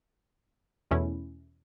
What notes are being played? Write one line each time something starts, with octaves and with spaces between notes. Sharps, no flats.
E2 B2 A3 C#4 E4